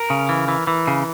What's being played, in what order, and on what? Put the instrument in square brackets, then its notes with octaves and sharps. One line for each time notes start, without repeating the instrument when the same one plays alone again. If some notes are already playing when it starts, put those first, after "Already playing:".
Already playing: [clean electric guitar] A#4
C#3
E3
E3
E3
C#3